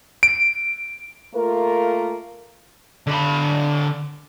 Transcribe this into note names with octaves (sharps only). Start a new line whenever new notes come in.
D7
A3 A#3 F4 A#4
D3 B5